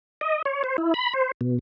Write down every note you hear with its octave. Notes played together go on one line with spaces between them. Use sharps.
D#5
C#5
C5
E4
B5
C5
B2